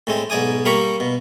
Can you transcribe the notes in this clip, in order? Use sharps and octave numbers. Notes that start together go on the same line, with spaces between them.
A2 G#3 C4
B1 G#2 D5 G#5 D#6
G3 A#3 A#4 B5 C#6
B2